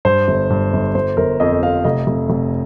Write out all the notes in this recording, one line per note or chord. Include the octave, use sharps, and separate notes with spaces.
G2 C5
G1
G2
G1
G1 C5
G1 A#4
F2 D#5
F2 F5
F1 D#5
F1
F1